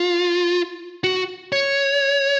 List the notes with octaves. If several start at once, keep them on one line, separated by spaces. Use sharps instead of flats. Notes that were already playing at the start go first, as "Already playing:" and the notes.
Already playing: F4
F#4
C#5